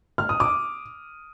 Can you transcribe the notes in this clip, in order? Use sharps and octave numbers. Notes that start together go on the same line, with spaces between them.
F6
D#6
D6